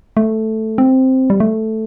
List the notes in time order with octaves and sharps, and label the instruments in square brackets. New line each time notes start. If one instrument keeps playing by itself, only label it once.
[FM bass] A3
C4
G3
A3